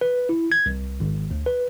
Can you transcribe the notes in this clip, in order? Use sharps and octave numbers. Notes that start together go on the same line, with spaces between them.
B4
E4
G#6
C2
G#1
D2
B4